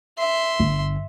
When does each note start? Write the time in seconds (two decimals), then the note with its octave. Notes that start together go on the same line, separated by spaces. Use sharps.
0.18 E5 C6
0.60 G1